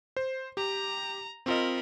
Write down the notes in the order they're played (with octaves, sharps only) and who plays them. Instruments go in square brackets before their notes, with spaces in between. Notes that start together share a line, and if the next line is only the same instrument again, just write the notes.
[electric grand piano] C5
[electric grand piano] G4 [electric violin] A#5
[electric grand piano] C4 F4 D#5 [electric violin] A#4 B5